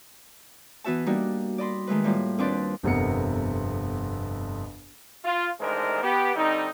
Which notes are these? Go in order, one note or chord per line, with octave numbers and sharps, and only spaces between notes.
E3 B3 F#4 E5 A5
G3 A#3 D4 D#4 F#4
D5 D#5 B5 C6
D#3 G#3 A3 B4
A2 G3 A#3 F4
D#2 C4 D4 B4 D5 C6
G1 F2 C3 B3 A#4 C#7
F4
A1 D#3 G#3 D4 A#4 C5
B3 G4
D3 G3 C4 D#4